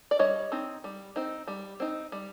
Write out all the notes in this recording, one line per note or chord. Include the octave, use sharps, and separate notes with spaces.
D5
G3 C#5 D#5
C4 D#4
G3
C4 D#4
G3
C4 D#4
G3